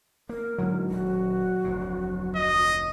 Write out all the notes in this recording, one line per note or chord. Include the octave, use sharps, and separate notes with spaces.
A#3 A#4
G#2 D3 E3 F#3
D#1 F#4
F1 D2 A2
D#5